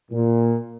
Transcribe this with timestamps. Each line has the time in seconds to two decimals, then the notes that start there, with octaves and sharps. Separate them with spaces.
0.11 A#2